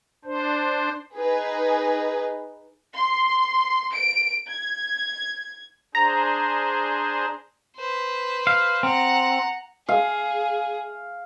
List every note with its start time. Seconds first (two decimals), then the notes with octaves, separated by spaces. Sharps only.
0.25 D4 C5
1.17 D#4 G#4 B4
2.96 C6
3.94 D7
4.48 G#6
5.95 D4 G#4 C5 A#5
7.76 B4 C5
8.47 F5
8.83 C4 F#5 A#5
9.89 G#4 F5